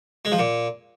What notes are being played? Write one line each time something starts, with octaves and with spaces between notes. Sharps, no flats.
G#3
F3
A#2